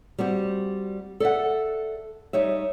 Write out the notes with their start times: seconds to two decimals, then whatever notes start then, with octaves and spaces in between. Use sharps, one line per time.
0.18 G3 C4 F#4 G4
1.20 A4 D5 E5 F#5
2.33 G3 D#4 C#5 E5